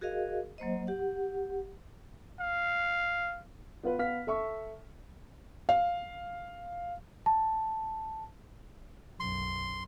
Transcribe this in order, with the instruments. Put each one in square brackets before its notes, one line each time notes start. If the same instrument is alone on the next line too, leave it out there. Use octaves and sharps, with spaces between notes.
[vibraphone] F#4 G#4 A#4 D#5 F5
F#3 A#3 C5 D#5
G4 F#5
[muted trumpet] F5
[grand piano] B3 F4 B4
B3 F5 F6 B6
A4 E5 C#6
[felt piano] F5
[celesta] A5
[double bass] B1 F#2 [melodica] C6